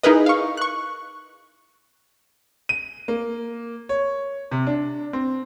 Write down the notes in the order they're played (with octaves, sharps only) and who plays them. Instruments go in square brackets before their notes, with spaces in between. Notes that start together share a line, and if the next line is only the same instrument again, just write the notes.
[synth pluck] D#4 E4 G#4 A#4 B4 D#5
F5 C#6
C#6 F#6
[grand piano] D#7
A#3
C#5
C3
D4
C4